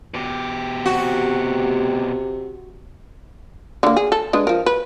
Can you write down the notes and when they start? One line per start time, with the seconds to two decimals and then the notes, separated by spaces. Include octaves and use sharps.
0.14 B2 G4
0.85 C3 F#4
3.83 D3 A#3
3.96 G#4
4.12 A4
4.33 G#3 D4 B4
4.47 F3 A#4
4.66 B4